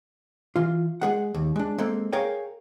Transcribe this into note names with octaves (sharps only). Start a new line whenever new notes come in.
E3 F4
G#3 G#4 F#5
D#2
G#3 D4
G#3 A#3 C4 A4
G#4 A#4 C#5 F5 G5